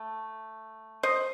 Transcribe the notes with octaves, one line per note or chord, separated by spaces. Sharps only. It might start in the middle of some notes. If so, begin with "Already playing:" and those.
Already playing: A3
C5 D#5